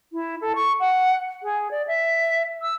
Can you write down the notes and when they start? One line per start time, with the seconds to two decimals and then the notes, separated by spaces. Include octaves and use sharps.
0.12 E4
0.41 A4
0.55 C#6
0.79 F#5
1.43 G#4
1.71 D5
1.87 E5
2.62 E6